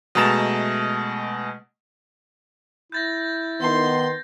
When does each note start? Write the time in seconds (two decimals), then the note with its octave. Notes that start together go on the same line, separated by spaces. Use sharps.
0.15 B2 G#3 A3 A#5 A6 E7
2.92 E4 G6 A6 A#6
3.61 D#3 B3 C6